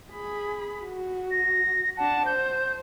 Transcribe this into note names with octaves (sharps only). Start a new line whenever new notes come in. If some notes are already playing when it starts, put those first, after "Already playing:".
G#4 B5
F#4
A#6
D4 F#5 A5
C5 G6